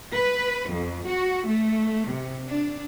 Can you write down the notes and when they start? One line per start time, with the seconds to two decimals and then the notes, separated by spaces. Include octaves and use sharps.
0.13 B4
0.70 F2
1.07 F#4
1.47 A3
2.10 C3
2.46 D4